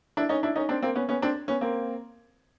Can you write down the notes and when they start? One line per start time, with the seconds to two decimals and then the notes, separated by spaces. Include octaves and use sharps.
0.17 D4 E4
0.29 C#4 D#4
0.43 D4 E4
0.56 C#4 D#4
0.69 C4 D4
0.82 A#3 C4
0.95 B3 C#4
1.09 B3 C#4
1.22 C4 D4
1.48 B3 C#4
1.61 A#3 C4